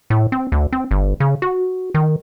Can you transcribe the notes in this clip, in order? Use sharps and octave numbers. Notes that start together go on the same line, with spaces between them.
A2
C4
D2
C4
G1
C#3
F#4
D#3